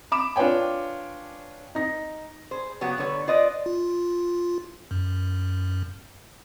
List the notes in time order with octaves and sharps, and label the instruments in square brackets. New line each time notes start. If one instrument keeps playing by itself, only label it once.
[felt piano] B5 D6 E7
D4 F4 B4 C#5 G5 G#5
D#4 A#6
[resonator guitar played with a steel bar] G#4 C5
C#3 F#3 B3 G4
D3 B4 C#5
F4 B4 C5 D5 D#5
[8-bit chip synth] F4
F#2